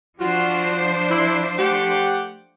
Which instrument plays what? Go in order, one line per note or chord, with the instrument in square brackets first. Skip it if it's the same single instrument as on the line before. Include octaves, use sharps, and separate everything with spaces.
[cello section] F3 D4 C5 [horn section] F4 F#4
[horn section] E4
A3 G4 F#5